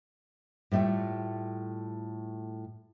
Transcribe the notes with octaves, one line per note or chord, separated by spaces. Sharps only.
A2 G3 A3 F4 G5